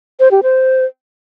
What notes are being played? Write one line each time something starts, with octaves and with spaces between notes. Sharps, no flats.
C5
G4
C5